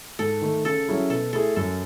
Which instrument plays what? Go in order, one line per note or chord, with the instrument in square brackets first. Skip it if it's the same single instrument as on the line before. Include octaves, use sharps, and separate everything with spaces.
[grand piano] G#2 [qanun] A4
[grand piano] D#3 A3
[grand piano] C#3 [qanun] A4
[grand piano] F#3 C#4 E4 G#4
[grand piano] B2 [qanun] A4
[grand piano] A3 E4 G#4 [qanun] A4
[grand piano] F#2 [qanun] A4